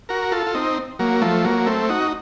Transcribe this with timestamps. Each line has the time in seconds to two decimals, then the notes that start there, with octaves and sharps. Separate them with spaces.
0.09 F#4 A#4
0.32 F4 A4
0.47 F4
0.54 C4 D#4
0.99 F#3 A#3
1.21 F3 A3
1.45 F#3 A#3
1.66 A3 C4
1.89 D#4 F#4